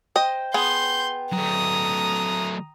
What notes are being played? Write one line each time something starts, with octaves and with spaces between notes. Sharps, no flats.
C5 D#5 G5
B3 G#4 C6 G6
F#3 A3 A#5 D#6